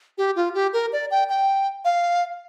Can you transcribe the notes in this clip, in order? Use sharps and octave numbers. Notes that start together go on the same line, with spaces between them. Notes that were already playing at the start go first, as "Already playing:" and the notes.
G4
F4
G4
A#4
D5
G5
G5
F5